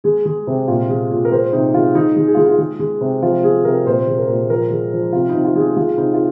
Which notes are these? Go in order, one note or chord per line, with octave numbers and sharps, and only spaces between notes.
G#3 G#4
G#3
C3
A#2 F4
G#3
A#2
A#4
G#3 C5
C3 D#4
G#3 F4
G#3 D#4
G#3
G#4
F4
G#3 D#4
F4
G#3
G#3
C3
F3 F4
G#3 G#4
C3 A#4
A#2 C5
G#3
A#4
A#2
F3 A#4
G#3
F3
C3 F4
D#4
C3
F4
G#3 G#4
G#3 F4
C3 D#4
F4